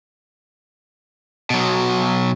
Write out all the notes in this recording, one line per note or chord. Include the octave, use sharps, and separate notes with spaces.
B2 F#3